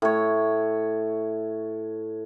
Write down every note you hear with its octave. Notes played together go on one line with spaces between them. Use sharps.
A2 C#5